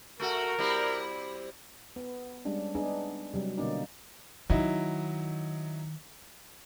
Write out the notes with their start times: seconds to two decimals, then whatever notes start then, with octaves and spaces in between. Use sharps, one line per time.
0.20 A3 F#4 A#4
0.59 G3 C4 E4
1.96 B3
2.45 G3 G#3 C#4 D4
2.75 B3 D4 D#4 G#4
3.33 C3 F#3 G3
3.57 B2 D3 A#3 C#4 D#4 D5
4.50 D#3 F#3 D#4 E4